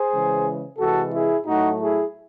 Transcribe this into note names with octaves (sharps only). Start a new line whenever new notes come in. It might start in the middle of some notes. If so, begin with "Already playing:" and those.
Already playing: G#4 C5
C#3 E3 G#3
C3 E3 G#3 F#4 A4
E4 G#4
A2 F#3 A3 D#4 F#4
E4 G#4